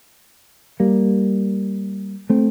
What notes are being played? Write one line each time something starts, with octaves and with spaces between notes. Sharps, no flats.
G3 A#3
A3 C4